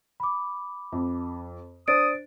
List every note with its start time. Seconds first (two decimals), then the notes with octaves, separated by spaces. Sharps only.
0.20 B5 D6
0.92 F2
1.88 D4 C5 D#6 A6 D7